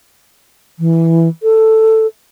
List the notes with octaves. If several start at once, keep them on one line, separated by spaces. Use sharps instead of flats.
E3
A4